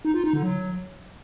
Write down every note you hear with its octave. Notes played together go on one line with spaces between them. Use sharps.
D#4
F4
D#4
D3
F#3